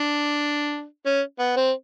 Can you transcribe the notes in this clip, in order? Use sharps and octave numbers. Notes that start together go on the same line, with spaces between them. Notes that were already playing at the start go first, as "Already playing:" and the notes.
Already playing: D4
C#4
B3
C4